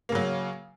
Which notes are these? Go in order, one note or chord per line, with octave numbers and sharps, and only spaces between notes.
C#3 F#3 A#3